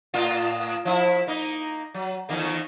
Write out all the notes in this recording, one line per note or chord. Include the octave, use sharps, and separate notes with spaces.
A2 F4
F3 E4
A#3 D#4
F#3
E2 D#3 A#3